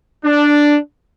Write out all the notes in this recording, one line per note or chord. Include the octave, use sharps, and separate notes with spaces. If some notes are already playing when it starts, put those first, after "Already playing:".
D4